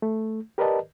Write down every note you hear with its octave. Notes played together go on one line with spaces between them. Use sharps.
A3
G4 A#4 B4 D5 D#5 A5